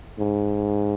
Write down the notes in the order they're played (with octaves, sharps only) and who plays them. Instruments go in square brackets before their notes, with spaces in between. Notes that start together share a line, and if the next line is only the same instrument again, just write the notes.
[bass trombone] G#2